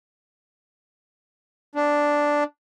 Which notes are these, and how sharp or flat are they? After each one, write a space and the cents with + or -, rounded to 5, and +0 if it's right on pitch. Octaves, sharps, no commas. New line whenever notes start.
B3 +40 D4 +0